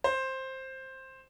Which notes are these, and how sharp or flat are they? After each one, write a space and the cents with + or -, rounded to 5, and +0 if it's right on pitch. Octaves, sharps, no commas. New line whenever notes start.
C5 +10